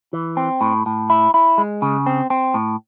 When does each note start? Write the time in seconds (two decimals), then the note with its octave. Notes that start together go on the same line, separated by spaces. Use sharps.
0.13 E3
0.37 C4
0.61 A2
0.86 A2
1.10 E4
1.34 E4
1.58 G#3
1.82 C#3
2.06 C4
2.30 C4
2.54 A2